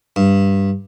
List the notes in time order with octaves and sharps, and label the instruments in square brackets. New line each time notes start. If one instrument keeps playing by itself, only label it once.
[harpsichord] G2